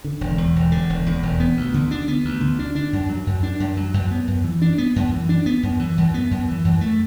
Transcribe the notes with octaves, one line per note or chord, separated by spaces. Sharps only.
D3
E1
E2
E1
D3
E1
E2
E1
B3
D2
D3
D4
B3
D2
D3
D4
D4
F#2
F#3
F#2
D4
F#2
F#3
F#2
B3
F#2
E3
D4
B3
F#2
E3
D4
B3
F#2
E3
F#2
B3
F#2
E3
F#2
A3